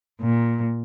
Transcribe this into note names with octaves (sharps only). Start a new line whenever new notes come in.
A#2